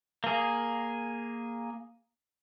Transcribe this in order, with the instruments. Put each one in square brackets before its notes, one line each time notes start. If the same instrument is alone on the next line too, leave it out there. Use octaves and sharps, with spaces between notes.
[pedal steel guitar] A#3 G#4